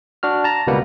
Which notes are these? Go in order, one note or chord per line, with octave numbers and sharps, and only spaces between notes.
D4 F#4 F6
A5 A#5
C#2 B2 G3 A#3 B4 F#5